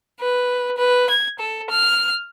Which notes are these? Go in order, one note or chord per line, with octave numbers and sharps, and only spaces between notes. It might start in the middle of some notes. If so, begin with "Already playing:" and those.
B4
B4
G#6
A4
F6